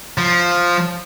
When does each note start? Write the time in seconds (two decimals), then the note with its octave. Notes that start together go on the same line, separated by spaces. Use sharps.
0.18 F3